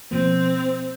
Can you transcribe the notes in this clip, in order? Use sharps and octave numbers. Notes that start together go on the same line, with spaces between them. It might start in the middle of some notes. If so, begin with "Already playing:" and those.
B2 F3 A#3 C4